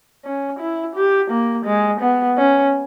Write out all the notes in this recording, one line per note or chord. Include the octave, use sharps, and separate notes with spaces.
C#4
E4
G4
A#3
G#3
B3
C#4